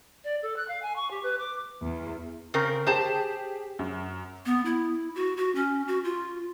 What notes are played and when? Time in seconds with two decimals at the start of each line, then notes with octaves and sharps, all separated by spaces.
0.24 D5
0.42 A4
0.56 F#6
0.68 F5
0.82 G#5
0.96 C#6
1.11 G4
1.23 B4
1.39 D6
1.81 E2
2.54 C#3 C4 A#4
2.87 G4 G#4 C5 A5
3.79 F#2
4.46 B3
4.65 E4
5.15 F#4
5.37 F#4
5.55 C#4
5.88 F#4
6.04 F4